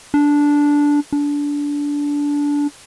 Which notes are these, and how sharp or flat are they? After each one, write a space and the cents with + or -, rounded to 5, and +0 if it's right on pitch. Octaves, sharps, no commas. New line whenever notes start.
D4 -10
D4 -20